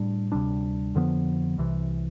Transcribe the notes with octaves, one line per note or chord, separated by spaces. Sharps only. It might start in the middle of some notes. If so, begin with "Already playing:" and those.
Already playing: A2 G3 D4
D2 C3 G3 D4
F2 D3 F3 B3
C2 C3 E3